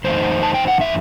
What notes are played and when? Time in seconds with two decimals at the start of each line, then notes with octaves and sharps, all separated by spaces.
0.04 F#2 E3 A3 C4 D#4 C5
0.43 A5
0.54 G5
0.68 F#5
0.81 E5